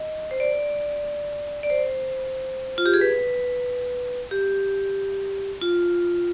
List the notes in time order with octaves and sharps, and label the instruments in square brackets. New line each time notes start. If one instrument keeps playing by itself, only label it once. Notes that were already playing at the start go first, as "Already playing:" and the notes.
Already playing: [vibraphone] D#5
C5
D5
D5
C5
F4
G4
G#4
B4
G4
F4